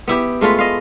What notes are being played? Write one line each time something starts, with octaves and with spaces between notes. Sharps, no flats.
B3 E4 G4
G#3 A3 F4 B4
D#5 F5